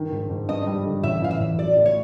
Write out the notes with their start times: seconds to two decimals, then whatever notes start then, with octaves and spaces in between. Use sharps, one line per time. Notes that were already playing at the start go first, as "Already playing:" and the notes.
Already playing: G2 D#3
0.12 G#2
0.30 G#2
0.49 G2 D#5
0.67 G3
0.85 D3
1.03 A1 E5
1.22 E3 F5
1.31 E5
1.40 A1
1.58 F#3 D5
1.77 A2
1.86 C#5